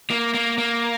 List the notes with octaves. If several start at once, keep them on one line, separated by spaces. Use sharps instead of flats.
A#3
A#3
A#3